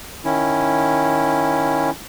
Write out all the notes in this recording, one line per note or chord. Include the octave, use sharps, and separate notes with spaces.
D#3 C#4 E4